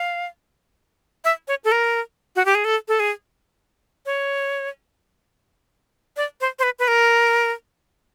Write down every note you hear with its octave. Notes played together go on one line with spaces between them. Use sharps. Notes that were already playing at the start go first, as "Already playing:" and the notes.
Already playing: F5
E5
C#5
A4
A#4
F#4
G4
G#4
A4
A4
G#4
C#5
D5
C5
C5
B4
B4
A#4